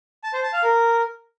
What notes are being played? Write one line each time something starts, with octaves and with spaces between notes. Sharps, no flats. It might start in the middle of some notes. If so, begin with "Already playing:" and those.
A5
C5
A5
F5
A#4